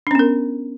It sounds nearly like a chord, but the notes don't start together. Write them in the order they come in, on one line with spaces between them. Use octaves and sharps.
D4 C#4 B3 A#4